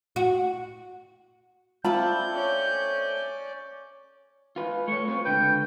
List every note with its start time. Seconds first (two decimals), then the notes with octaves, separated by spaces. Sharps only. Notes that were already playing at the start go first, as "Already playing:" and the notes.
0.16 F#4
1.85 A3 C4 D4 F4 A5 B5 G6
2.34 C#4 D5
4.56 F4 B4
4.88 A3 C#5 C#6
5.08 C4 F4 B4
5.25 C#2 D3 B4 G5